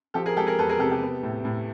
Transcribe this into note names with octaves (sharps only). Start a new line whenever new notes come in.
F3 G4 A4
G#4 A#4
G#3 G4 A4
G#4 A#4
E2 A4 B4
G#4 A#4
C3 G4 A4
G4 A4
B3
A2
A2